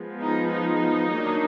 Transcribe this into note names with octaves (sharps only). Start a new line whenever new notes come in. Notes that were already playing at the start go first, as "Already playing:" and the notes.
Already playing: F3 G#3 B3
D#4
D#4
D#3 F#3 A#3 D4